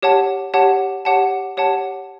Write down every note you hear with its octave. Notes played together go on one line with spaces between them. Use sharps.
G4 C#5 F#5 A5
G4 C#5 F#5 A5
G4 C#5 F#5 A5
G4 C#5 F#5 A5